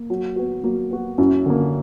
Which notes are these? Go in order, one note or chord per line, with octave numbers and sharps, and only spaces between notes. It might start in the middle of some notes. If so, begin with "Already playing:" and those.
Already playing: A#3
F#3
B3 F#4
F#3 A#3
B3 F#4
F#2 C#4 E4
D3 A#3